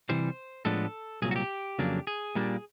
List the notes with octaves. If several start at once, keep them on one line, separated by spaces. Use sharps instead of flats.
C3 E3 G3 C5
A2 F3 G#3 B3 D4 A4
C2 A#2 F#3 G#4
F#4
G4
F2 C#3 F#3 A#3 D4
G#4
A#2 G3 A#3 D4